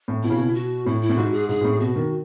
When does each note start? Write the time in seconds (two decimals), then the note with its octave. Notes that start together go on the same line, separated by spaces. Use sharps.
0.08 A2
0.23 B2 E4
0.30 C#3
0.37 B2
0.55 F#4
0.86 A2 E4
1.02 E4
1.09 A2
1.17 G#2 F#4
1.33 G#4
1.49 G#2 G#4
1.61 G#2
1.65 A2
1.80 B2 F#4
1.96 D#3